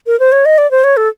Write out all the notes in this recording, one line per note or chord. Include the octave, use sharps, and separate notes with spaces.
A#4
C5
C#5
D#5
D5
C5
C#5
A4